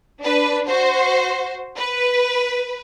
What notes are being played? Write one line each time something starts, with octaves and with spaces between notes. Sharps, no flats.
D4 B4
F#4 C5
B4